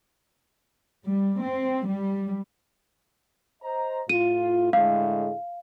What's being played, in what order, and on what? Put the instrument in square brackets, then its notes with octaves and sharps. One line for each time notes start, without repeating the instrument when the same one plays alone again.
[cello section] G3
C4
G3
[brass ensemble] C5 D#5 A#5
[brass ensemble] A2 F4 [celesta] D#7
[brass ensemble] A2 D3 G#3 [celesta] F5